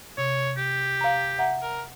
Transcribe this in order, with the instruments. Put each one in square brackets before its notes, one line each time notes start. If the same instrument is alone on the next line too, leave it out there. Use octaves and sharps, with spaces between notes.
[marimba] C3 [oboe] C#5
[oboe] G4
[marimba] F5 A#5
E5 F#5 A#5
[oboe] A#4